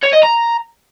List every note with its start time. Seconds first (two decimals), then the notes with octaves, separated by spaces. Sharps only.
0.03 C#5
0.13 D#5
0.23 A#5